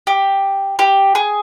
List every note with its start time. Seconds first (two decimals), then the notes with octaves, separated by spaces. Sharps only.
0.07 G4
0.79 G4
1.15 G#4